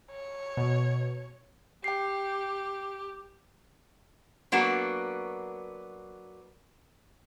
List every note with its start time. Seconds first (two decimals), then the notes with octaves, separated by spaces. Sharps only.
0.11 C#5
0.57 B2
1.84 G4 G5 C7
4.52 F#3 A#3 B3 D4 F#4